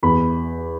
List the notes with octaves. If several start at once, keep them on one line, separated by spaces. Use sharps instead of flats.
E2 B5